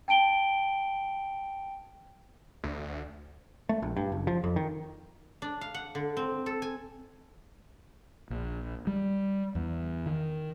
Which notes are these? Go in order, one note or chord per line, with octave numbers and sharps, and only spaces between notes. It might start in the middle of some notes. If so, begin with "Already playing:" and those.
G5 A5 D7 G7
D2
A3
A#1
G2
F#1
F3
F2
D#3
D4
F5
F#5
D3
C4
A4
G#5
A#1
G3
E2
D#3